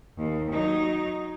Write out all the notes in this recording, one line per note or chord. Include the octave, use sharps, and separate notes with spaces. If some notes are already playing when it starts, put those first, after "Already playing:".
D#2
F#3 D#4